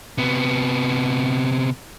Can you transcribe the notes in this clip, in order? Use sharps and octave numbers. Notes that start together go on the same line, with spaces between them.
C3 B3